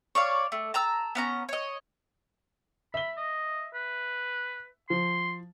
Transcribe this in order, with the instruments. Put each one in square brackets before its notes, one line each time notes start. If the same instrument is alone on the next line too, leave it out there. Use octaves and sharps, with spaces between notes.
[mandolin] C#5 D5 F5
A3
A5 A#5 E6
B3 C#4 A#5
C#5 D#5
[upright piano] E5 G7 [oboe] B5
[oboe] D#5
B4
[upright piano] F3 [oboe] C6